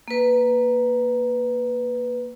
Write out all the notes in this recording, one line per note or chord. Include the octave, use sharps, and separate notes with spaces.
A#3 B4